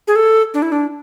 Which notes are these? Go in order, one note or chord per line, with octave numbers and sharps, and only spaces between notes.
G#4
A4
D4
E4
D4